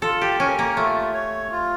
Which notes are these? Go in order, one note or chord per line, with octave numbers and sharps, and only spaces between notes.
F4 A4
G4
C#4 A#4
A#3
A3 F4
C#5
F4